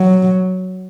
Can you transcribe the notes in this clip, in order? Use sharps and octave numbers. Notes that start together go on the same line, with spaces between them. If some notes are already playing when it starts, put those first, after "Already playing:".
Already playing: F#3